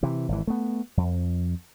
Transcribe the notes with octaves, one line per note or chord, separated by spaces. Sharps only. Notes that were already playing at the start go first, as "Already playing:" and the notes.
C3 E3
G#1 E3
A3 B3
F2